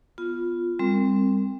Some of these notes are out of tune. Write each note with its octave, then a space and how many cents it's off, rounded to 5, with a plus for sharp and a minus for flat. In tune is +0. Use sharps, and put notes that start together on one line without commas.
B3 +0 F4 +0
G3 +30 C4 +0 A#4 -40